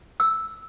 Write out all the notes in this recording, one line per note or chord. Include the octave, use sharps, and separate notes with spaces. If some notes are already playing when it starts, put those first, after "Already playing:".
E6